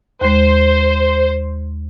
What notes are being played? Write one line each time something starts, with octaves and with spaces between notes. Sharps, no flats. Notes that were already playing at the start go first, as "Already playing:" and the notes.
D#2 G#3 C5